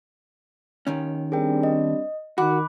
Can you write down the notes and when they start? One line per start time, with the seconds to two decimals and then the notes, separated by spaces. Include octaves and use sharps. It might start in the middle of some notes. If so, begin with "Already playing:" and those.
0.87 D#2 D#3 C#4
1.32 G3 C4 D4 G#4 A#4 G5
1.63 D#5
2.38 D#3 F#4 B5 D6 F#6